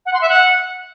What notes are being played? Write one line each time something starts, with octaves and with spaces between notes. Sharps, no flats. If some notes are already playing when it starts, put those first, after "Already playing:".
F#5
C6
E5
F#5